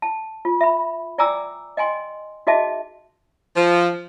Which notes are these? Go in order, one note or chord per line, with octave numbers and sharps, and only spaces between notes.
A5
F4
E5 B5
D5 G5 G#5 A#5 D6 E6
D#5 G5 G#5 C6
D#4 F#4 G#4 D#5 E5 A5
F3